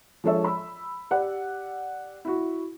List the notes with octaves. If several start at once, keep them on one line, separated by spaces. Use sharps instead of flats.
F3 G#3 D4 A4 C#5 E5
B5 E6
G4 D5 F#5
E4 F#4